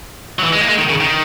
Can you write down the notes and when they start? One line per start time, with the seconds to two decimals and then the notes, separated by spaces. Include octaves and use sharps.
0.39 F#3
0.44 E3
0.53 G#3
0.61 A#3
0.69 G#3
0.78 D#3
0.89 C#3
1.00 D#3